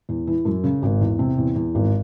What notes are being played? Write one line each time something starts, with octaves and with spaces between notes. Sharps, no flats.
E2
E3
F#2
C#3
G#1
E2
C3
E2
E2
G#1